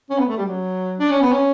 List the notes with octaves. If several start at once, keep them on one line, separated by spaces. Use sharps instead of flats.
C#4
B3
A3
G3
F#3
D4
C#4
B3
C#4